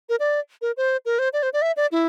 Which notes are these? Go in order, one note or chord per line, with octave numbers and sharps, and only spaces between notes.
A#4
D5
A#4
C5
A#4
C5
D5
C5
D5
E5
D5
E4